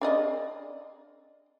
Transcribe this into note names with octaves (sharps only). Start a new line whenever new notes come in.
D4 D5 D#5